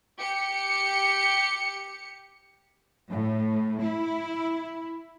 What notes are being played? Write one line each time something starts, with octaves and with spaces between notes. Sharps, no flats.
G4 C#7
A2
E4